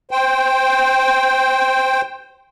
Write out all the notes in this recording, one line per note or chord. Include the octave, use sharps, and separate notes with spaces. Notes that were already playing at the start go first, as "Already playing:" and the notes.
C5 G5